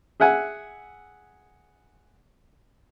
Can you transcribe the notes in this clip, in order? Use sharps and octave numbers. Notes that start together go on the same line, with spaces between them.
G#4 E5 F#5 G#5